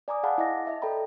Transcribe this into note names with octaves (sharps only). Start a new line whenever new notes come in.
D5 G#5 A#5 D6 D#6
G#4 F5 F#5 A5 B5
E4 D#5 D6 A#6
D#5 E5 A5
A4 D5 G5 A#5 B5